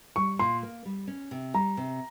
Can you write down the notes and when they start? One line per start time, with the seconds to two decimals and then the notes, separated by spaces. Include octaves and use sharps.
0.16 G3 C#6
0.39 A#2 C6
0.63 A#3
0.85 G3
1.08 C#4
1.31 C3
1.54 G3 A#5
1.77 C3